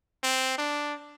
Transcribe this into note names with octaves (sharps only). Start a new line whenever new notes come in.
C4
D4